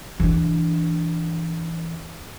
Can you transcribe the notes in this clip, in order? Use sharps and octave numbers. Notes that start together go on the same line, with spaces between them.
E3 D4